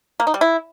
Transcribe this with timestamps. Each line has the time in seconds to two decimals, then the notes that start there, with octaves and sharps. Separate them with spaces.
0.20 A#3
0.27 D#4
0.34 G3
0.41 E4